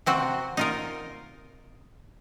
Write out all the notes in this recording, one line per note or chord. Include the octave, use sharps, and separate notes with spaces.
C3 C4 F#4
D#4 F4 A#4